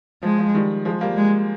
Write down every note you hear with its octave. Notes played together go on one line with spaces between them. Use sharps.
F3 G#3
F3
D#3 G3
F3 G#3
G3 A#3
G#3